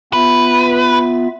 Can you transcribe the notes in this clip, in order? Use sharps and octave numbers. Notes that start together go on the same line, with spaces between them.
B3 F4 B4 E5